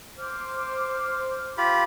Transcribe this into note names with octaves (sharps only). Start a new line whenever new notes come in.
C5 D6 F6
F4 G4 B5